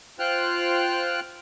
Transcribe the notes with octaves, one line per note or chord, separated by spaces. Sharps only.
F4 C5 G5 F6 F#6